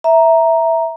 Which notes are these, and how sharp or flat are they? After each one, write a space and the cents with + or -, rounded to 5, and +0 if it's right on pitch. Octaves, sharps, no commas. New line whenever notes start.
E5 +0 A#5 +0